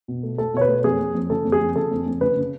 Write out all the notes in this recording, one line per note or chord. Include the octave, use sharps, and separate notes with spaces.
B2
A3
A3 A4
B2 C#5
B4
A3
F2 G#4
F2
F2
C#3 A4
F2
G#4
F2
C#3 A4
F2
F2
C#3 B4
C#3